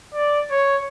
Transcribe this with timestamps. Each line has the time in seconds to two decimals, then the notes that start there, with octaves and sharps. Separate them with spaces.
0.15 D5
0.51 C#5